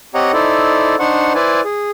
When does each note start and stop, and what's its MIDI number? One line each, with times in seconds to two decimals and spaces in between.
0.15 0.32 60
0.15 0.32 67
0.15 0.32 73
0.15 0.32 75
0.15 0.32 78
0.15 0.32 82
0.33 0.95 63
0.33 0.95 64
0.33 0.95 69
0.33 0.95 72
0.33 0.95 74
0.99 1.33 62
0.99 1.33 63
0.99 1.33 72
0.99 1.33 78
0.99 1.33 85
1.35 1.61 64
1.35 1.61 71
1.35 1.61 72
1.35 1.61 74
1.35 1.61 80
1.65 1.91 68